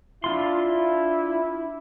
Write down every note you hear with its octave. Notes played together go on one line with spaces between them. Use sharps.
D4 E4 F4 C6